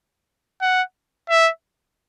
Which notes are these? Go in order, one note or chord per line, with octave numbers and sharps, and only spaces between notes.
F#5
E5